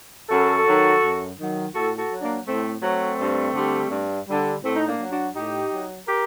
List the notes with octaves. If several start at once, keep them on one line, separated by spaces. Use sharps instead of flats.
F#2 F#4 A4
D#3 F#3
F#2
D#3 F#3
A2 F#4 A4
F#4 A4
F#3
A#3 D4
A2 A3 C4
F#3 A3 C4
G2
D3 G3
G2
D3 G3
A2 A3 C4
D#4
A#3 D4
F#3
D4 F#4
A2 D#4 G4
F#3
G4 A#4